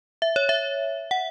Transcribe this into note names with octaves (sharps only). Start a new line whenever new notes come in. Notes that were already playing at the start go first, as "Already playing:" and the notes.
E5
C#5
E5
F#5